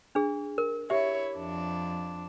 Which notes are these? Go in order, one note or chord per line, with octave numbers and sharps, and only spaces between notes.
D4 G#4
A#4
E4 G4 C#5 E5
F2 D4